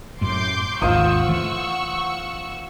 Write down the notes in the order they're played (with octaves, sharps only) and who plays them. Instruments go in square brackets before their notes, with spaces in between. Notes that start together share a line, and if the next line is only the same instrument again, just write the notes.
[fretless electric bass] F#2 A2 [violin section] C6 D6 G6
[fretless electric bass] G#1 D#2 [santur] F4 C5 D#6 [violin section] F#5 C#6 E6
[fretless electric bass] E3 A3